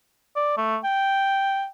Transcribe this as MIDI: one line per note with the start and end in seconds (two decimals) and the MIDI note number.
0.36 0.52 74
0.57 0.78 57
0.84 1.67 79